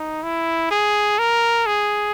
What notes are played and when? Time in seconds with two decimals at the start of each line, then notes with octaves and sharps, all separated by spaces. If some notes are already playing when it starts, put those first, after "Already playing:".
Already playing: D#4
0.23 E4
0.71 G#4
1.19 A#4
1.66 G#4